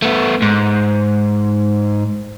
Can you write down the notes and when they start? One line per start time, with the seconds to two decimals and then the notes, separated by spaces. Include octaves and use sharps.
0.02 A3 B3
0.42 G#2